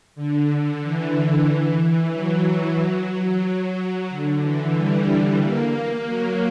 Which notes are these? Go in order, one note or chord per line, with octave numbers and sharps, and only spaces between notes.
D3
E3
F#3
F#3
D3
E3
G3
A#3
F#3